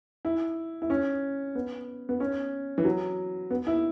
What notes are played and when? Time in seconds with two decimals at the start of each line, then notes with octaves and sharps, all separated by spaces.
0.25 E4
0.82 E4
0.90 C#4
1.55 B3
2.09 B3
2.20 C#4
2.78 E3
2.85 F#3
3.51 B3
3.67 E4